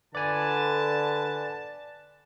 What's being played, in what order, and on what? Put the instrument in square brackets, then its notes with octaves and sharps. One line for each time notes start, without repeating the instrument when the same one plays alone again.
[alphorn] D3 [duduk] B4 [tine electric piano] D5 G#5 [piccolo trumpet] A5